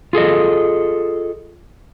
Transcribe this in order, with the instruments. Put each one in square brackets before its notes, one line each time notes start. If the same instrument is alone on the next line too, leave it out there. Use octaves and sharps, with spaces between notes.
[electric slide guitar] F4 G#4 A4 D#5